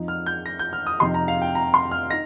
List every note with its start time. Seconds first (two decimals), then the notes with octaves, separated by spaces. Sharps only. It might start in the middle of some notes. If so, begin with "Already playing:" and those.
Already playing: F2 F3 D#4
0.08 F6
0.26 G6
0.46 A#6
0.59 G6
0.73 F6
0.87 D#6
1.00 F2 C3 F3 D#4 C6
1.14 A#5
1.28 F5
1.42 G5
1.55 A#5
1.74 C6
1.91 F6
2.10 D#4 A#6